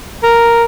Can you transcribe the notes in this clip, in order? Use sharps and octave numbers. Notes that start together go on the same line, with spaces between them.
A#4